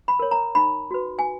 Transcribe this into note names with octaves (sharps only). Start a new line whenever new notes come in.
B5
A#4 C#5
A#5
D#4 B5
F#4 B4
G#5